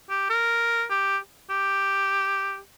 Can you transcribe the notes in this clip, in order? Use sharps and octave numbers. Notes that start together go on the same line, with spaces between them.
G4
A#4
G4
G4